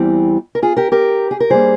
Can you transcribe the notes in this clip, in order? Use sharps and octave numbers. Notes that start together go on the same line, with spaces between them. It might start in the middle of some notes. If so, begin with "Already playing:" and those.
Already playing: E2 E3 G3 C4
A#4
F4 G#4
G4 A#4
G4 A#4
G#4
A#4
G2 G3 A#3 G#4 C5